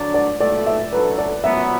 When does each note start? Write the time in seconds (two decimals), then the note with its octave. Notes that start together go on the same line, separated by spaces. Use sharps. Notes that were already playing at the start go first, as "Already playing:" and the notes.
Already playing: D3 F#3 D4
0.14 D5
0.40 B1 A2 A3 D5
0.66 E5
0.92 F#2 F#3 D4 A4 B4
1.18 D5
1.44 F#2 F#3 B3 E5